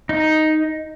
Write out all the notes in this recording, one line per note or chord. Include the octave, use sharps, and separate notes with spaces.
D#4